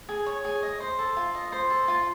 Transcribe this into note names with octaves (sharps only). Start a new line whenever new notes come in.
G#4
C#5
G#4
D#5
C5
A4
F4
D#5
C5
A4
F4